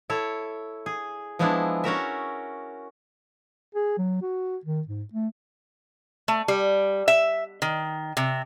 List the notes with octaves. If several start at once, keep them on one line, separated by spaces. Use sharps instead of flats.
E4 A4 C#5
G#4
F3 G#3 B3 D4 E4
C#4 F#4 A#4 E5
G#4
F#3
F#4
D#3
G#2
A3
A3
G3
E5
D#3
C3